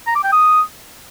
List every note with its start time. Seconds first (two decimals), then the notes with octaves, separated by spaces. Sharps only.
0.07 A#5
0.15 D6
0.24 G5
0.32 D#6